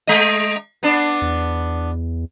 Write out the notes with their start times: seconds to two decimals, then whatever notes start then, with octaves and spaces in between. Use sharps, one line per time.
0.07 G#3 D#5
0.83 B3 D4
1.22 E2